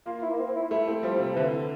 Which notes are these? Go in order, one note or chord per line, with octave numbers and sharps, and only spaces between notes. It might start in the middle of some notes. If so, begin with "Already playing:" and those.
A#3 F4
E4
A#3
C4
E4
A3 E4
C4
F3 G3
C3
F3
D3 E3